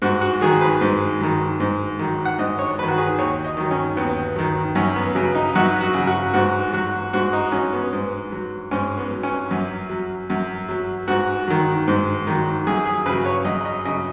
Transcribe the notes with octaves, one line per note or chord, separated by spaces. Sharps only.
G#2 F#4
F#4
D#3 F#3 G#4
B4
G#2
D#3 F#3
G#2
D#3 F#3
F#5
G#2 D#5
C#5
D#3 F#3 B4
F#4
G#4
D#2 C#5
D#5
D#3 F#3
C#4
D#2 B3
D#3 F#3
F#2 C#4
B3
C#3 F#3
D#4
F#2 F#4
F#4
C#3 F#3
F#4
G#2 F#4
F#3 F#4
G#2 F#4
D#4
F#3 C#4
B3
G#2
F#3
G#2 C#4
B3
F#3
C#4
F#2
F#3
F#2
F#3
G#2 F#4
D#3 F#3
G#2
D#3 F#3
F#2 G#4
G#4
C#3 F#3 B4
C#5
F#2 D#5
D#5
C#3 F#3 D#5